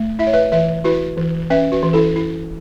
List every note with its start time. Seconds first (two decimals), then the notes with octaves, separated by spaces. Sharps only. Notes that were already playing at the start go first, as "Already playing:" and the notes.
Already playing: A3
0.19 E4 E5
0.27 C#5
0.33 B4 E5
0.52 E3 B4 E5
0.84 E4 F#4 B4
1.17 E3
1.50 C#4 B4 E5
1.72 F#4 B4
1.83 E3
1.93 E4 A4
2.16 E4